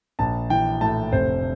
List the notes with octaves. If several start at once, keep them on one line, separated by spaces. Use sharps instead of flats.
A#1 A5
E3 G5
A2 A5
F1 C5